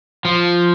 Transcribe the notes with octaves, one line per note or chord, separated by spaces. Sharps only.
F3